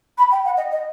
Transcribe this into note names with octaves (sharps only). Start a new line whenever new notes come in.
B5
G5
F#5
D#5
D#5